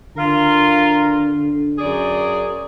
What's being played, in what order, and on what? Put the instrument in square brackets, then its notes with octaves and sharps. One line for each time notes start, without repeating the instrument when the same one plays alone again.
[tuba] D3 [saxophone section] F4 A#4 F5
[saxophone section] F#2 G#4 D5